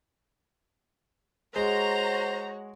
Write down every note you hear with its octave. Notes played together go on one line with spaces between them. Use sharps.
G#3 F#4 C5 C#5 A#5